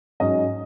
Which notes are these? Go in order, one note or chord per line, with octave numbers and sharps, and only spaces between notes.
G#2 F#3 C#4 D#5